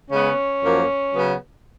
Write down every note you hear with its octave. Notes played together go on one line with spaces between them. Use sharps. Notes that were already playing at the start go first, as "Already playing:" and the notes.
C#3 G#3 B3 C#4
F#2 F3 A#3
C#3 F#3 B3